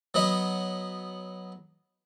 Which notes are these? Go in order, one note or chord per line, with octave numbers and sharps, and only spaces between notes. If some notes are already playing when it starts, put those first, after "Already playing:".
F#3 B3 D#5 B5